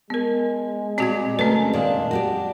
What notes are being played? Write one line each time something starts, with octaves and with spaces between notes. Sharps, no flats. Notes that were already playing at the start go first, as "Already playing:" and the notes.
G#3 B3 A#4
A#2 D#3 G3 C4 F#4 G#6
C#3 A3 C4 A#4 B4
A#2 D#3 D4 F5
F#4 G4 D5